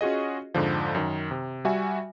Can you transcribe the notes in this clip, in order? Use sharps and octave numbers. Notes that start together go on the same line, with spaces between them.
C#4 F4 F#4 G#4 D#5
F2 G#2 D3 F3
F#2 D#3
C3
G3 F#4 E5 G#5